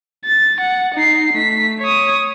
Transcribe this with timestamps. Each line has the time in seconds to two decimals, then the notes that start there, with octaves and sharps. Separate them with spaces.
0.25 A6
0.60 F#5
0.95 D#4 C7
1.33 A3 B6
1.81 C#5 D#6